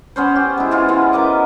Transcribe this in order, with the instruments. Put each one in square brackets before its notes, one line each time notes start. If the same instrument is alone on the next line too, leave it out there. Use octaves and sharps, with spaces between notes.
[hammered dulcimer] B3 C#4 C5
G4
G#3 E4
E3 F4 F#4
E3 G#3 B3 C#4
A#4 B4 D#5 D6